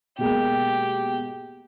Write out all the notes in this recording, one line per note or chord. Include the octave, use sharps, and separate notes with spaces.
B2 G#3 A#3 G4